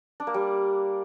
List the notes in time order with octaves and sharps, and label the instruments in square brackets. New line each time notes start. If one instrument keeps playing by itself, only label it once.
[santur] D4
A#3
G3